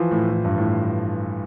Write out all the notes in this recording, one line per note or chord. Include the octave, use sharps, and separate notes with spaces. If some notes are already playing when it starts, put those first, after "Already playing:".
Already playing: E3 F3
A2
A2
G2
A2